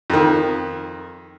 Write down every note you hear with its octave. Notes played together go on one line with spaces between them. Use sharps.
F2 D#3